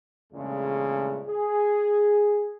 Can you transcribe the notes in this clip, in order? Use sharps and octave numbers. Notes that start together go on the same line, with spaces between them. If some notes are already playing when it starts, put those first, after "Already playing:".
E2 G2 A#2 C#3 G#3 A3
G#4